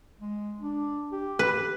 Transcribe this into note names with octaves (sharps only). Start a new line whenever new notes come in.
G#3
D4
G4
B4